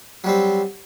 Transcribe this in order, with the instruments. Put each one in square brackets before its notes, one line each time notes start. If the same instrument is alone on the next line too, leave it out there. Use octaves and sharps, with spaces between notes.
[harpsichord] F#3 G3 C4